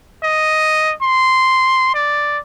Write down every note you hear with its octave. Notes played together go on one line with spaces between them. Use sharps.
D#5
C6
D5